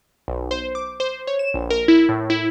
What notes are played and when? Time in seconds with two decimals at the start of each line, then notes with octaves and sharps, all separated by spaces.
0.28 B1
0.51 C5
0.75 D6
1.00 C5
1.27 C#5
1.39 E7
1.54 A#1
1.70 A#4
1.88 E4
2.09 A2
2.30 E4